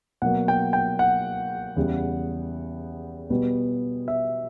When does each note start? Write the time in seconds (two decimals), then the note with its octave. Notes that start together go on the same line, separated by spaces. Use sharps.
0.22 B2 F#3 A#3 F#5
0.48 G5
0.73 G5
0.99 F#5
1.76 E2 C#3 G3
3.30 B2 G3 B3
4.08 E5